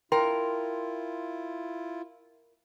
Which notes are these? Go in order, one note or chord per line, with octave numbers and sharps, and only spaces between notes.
E4 F4 A#4 G5 C6